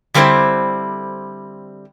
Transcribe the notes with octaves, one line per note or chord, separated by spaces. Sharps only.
D3 G3 C4 E4 C5